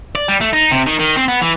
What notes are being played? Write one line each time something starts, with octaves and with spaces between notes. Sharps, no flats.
D5
G3
A3
D#4
C3
D#3
D#3
C4
B3
E3